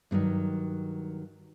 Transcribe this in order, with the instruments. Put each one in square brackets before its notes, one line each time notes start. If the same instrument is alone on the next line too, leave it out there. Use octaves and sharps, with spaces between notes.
[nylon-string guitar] G2 D3 D#3 F#3